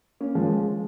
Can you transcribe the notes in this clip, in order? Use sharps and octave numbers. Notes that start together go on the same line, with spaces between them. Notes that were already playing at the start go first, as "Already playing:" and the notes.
A#3 C#4
F3 G#3
F3 G#3